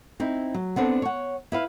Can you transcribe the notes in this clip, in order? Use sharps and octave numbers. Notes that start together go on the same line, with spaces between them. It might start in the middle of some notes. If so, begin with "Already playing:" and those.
C4 D#4 E4
F#3
B3 C4 D4 A4
C#5 F#5
E4 B4 F5